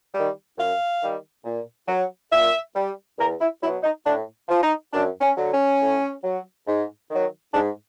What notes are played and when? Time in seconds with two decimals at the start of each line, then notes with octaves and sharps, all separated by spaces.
0.15 D#3 G3
0.57 F#2 F5
1.01 D#3 G3
1.45 A#2
1.88 F#3
2.31 A#2 E5
2.75 G3
3.18 E2 A#4
3.41 E4
3.63 B2 F#3 E4
3.83 D#4
4.06 A2 D4
4.49 F3
4.63 D#4
4.93 F#2 D4
5.21 C#4
5.37 D3 F#3
5.51 C#4
5.80 A2
6.24 F#3
6.67 G#2
7.10 D#3 F#3
7.53 G#2 D4